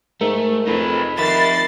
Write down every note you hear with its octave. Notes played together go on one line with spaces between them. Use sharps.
G#2 A3 A#4
F2 D#4 B4
F2 D#3 E5 B5 A6 C7